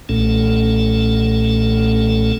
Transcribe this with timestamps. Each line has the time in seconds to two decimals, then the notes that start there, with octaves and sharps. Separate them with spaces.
0.09 B1 A#2 A3 C#4 A4